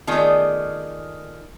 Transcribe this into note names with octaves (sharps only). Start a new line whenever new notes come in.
D#3 A3 B3 F4 G#4 D5